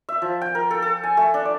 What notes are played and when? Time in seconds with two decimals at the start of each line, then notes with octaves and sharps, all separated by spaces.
0.09 E5
0.22 F3
0.41 G5
0.55 A#4
0.71 A4
0.82 A4
1.03 G#5
1.17 A3
1.34 D4
1.45 D5